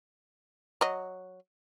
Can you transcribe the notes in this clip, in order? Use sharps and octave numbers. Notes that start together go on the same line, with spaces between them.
F#3 D#5